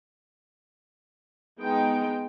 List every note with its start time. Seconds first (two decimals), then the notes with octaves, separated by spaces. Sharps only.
1.60 G#3 B3 D#4 G5